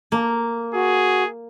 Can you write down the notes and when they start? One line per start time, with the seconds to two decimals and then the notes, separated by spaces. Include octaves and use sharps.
0.12 A#3
0.74 F#4 G#4